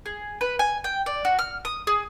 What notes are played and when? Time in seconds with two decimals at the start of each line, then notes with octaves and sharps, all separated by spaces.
0.06 G#4
0.41 B4
0.59 G#5
0.84 G5
1.06 D5
1.25 F#4
1.39 F6
1.65 D#6
1.87 G#4